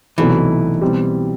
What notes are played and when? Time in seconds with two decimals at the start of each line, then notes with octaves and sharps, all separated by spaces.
0.18 C2 B2 E3 F#3 A3 D#4
0.81 B2 G3 C4